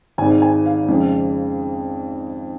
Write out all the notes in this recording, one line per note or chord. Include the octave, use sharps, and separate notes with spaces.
G#1 G#2 G#3 G#5
G#5
F5
F2 C#3 G#3